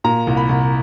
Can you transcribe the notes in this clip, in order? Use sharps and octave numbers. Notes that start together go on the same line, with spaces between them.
A#2 A#5
C2
B5
C2